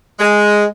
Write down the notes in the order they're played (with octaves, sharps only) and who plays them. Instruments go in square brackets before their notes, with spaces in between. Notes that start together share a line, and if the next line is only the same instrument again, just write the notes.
[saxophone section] G#3